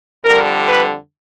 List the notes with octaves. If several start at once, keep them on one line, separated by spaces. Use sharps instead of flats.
F2 D3 G3 A#4
B4